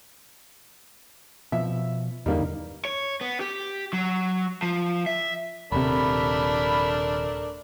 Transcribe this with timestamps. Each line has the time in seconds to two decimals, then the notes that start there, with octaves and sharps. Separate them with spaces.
1.52 B2 F3 E5
2.26 E2 G2 D3 G3 A#3 D#4
2.85 C#5
3.21 B3
3.41 G4
3.93 F#3
4.62 F3
5.07 E5
5.72 D#1 C3 A3 D4 A#4 B5